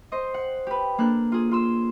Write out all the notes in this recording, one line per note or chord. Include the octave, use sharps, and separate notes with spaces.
C5 D#5
F#5
G4 B4
A#3 D4 A4 F#6
F4 G#4
F4 C6 E6